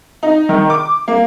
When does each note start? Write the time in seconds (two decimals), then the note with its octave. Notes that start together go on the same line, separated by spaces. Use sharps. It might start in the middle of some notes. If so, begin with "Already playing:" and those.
0.23 D#4
0.49 D#3
0.70 D6
1.08 A#3